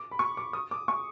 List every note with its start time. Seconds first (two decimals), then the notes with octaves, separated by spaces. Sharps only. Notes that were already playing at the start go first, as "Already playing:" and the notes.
Already playing: D6
0.11 B5
0.19 C#6
0.37 D6
0.53 D#6
0.71 D6
0.88 C#6